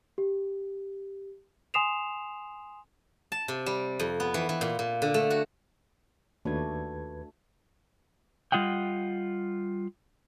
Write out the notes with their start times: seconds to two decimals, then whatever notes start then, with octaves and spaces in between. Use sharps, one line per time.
0.18 G4
1.74 G#5 C6 D#6 C7 E7 F7
3.32 A5
3.48 C3
3.66 G3
3.99 F2
4.20 B3
4.34 E3
4.49 E3
4.61 A#2
4.79 A#2
5.02 D3
5.14 A3
5.30 F#4
6.45 D#2 A3 D4 F#4 B4 G#6
8.52 G3 F4 D#5 F#5 G5